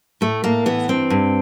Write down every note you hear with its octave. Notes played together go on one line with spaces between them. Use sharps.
A2 A3
A2 A#3
E3 B3
G2 C4
G2